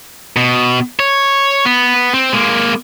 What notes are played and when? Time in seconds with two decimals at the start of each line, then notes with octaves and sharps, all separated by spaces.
0.36 B2
1.00 C#5
1.66 B3
2.14 C4
2.32 G#3 A#3